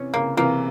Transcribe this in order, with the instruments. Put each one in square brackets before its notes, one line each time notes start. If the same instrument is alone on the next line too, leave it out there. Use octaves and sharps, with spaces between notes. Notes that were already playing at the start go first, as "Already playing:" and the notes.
Already playing: [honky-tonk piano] C3 E3 [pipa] C#4
[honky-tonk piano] C#3 [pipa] A#3
[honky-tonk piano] C3 E3 [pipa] A#3